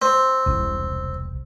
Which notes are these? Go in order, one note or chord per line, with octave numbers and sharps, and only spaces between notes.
C4
E1 C2